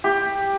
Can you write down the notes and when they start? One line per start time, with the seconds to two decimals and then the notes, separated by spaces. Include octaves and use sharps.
0.04 G4